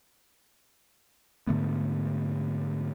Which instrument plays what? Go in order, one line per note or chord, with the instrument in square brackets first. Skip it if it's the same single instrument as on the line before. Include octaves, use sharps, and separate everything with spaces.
[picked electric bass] G#2 D3 A3 B3